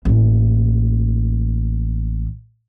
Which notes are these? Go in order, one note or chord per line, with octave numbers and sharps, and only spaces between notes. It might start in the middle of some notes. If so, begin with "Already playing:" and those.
A1 A#3